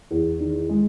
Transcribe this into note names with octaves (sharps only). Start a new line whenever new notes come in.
E2
D#3
G#3